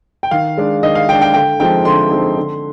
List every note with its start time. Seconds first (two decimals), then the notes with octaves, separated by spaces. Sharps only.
0.23 G5
0.31 D#3 F5
0.57 G#3 D4
0.83 D#3 D#5
0.95 F5
1.08 G#3 G5
1.13 D4
1.21 G5
1.34 D3 G5
1.60 F3 G#3 C4 D#4 G5
1.85 D3 C6
2.11 F3 G#3 C4 D#4
2.36 D3